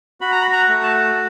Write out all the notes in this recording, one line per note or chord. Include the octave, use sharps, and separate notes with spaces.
F#4 B5
A#5
B5
A#5
A3
A5